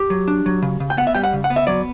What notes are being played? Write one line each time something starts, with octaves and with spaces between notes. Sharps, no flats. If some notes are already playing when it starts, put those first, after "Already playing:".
Already playing: G4
F#3
D4
F#3
C#3
C#3
G5
B3 F#5
E5
G3 G5
F#5
C#3
F#5
B3
E5
F#3 D5